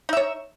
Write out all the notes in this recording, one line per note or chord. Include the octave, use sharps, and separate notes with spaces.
D#4 C#5 E5